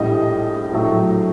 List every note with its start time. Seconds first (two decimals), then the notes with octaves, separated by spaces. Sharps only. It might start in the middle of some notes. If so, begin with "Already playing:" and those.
Already playing: A#1 A2 G3 D#5
0.71 A#1 A2 F#3 A3